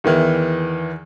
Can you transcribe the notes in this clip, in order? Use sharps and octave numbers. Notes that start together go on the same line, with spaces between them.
E2 D#3 E3